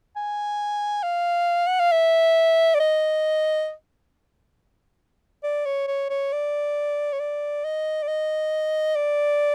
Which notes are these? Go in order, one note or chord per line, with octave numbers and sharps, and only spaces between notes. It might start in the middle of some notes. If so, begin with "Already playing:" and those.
G#5
F5
F#5
F5
E5
D5
D#5
D5
C#5
C#5
C#5
D5
C#5
D5
D#5
D5
D#5
D5